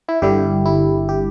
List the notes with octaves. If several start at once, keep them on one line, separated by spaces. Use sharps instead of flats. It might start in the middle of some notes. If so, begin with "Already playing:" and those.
E4
G1 G2 D3 G3 E4 G4
E4
G4